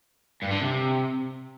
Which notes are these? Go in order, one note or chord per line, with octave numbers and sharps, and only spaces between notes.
G2
D3
C3